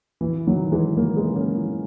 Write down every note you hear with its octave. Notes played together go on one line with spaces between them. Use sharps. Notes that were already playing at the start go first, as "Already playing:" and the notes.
E3
D#3 F#3
E3 G#3
F#3 A#3
G#3 B3
A#3 C#4
E3